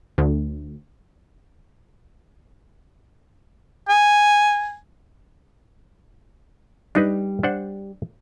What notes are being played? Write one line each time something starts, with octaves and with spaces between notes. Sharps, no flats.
D2
G#5
G3 D4 D#4 B4
D4 C5 F#5